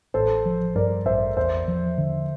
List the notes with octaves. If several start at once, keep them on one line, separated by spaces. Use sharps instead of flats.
A1 A4 C5
F3
G2 A#4 D5
A1 C5 E5
E2 C5 E5
F3
D3